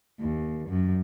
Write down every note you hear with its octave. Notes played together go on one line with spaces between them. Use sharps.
D#2
F#2